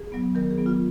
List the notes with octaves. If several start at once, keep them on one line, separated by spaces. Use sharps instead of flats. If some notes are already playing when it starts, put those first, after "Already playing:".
Already playing: G#4
F#3 B3
D#3 A#4
G#4
F#3 B3
F4